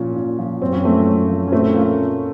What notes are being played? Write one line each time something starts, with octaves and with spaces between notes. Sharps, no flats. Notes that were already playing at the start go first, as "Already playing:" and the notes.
Already playing: A#2 F3 C#4
A#2
F3
F#2 C4
C#4
F3 A3 C4
F#2
F3
C#4
A#2 A3 C4
F3 A#3 C#4